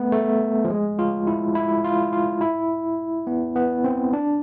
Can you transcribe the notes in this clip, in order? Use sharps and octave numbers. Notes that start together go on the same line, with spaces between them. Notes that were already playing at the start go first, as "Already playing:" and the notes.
Already playing: A3 B3
A3
F3
G#3
F4
E4
E4
F4
F4
E4
B3
B3
C4
D4